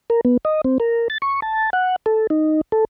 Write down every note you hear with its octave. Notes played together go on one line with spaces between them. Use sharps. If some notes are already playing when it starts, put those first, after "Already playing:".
A#4
B3
D#5
C4
A#4
A6
C#6
A5
F#5
A4
D#4
A4